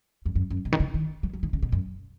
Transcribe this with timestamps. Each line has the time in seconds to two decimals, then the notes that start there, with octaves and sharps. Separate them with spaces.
0.26 F2
0.35 F#2
0.50 F#2
0.65 B2
0.72 D#3
0.80 C#3
0.94 D#3
1.23 F#3
1.33 F#3
1.43 D#3
1.53 C#3
1.62 B2
1.72 F#2